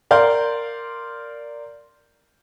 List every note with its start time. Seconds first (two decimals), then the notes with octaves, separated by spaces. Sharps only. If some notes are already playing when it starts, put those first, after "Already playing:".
0.11 A#4 D5 F5 C6 G6